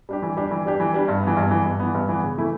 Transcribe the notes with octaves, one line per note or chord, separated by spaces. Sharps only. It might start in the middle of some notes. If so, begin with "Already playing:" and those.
G3 D4 G4
E3
G3 D4 G4
E3
G3 D4 G4
E3
G3 D4 G4
G2
E3 B3
G2
E3 B3
G2
E3 B3
G2
E3 B3
C#3
E3 A3 E4